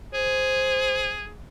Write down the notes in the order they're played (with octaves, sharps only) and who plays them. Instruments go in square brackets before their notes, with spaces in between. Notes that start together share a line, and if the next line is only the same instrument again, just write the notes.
[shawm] G#4 [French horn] C5